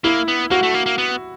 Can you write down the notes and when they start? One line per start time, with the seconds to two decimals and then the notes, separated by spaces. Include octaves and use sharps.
0.04 A#3 E4
0.28 B3
0.51 A#3 F#4
0.63 A3
0.74 A#3
0.86 A#3
0.98 B3